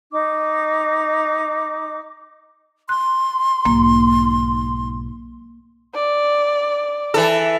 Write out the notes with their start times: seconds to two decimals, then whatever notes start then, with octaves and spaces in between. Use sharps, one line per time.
0.12 D#4 D6
2.89 C6 F#6
3.65 B1 G#2 A#3
5.94 D5
7.14 E3 A4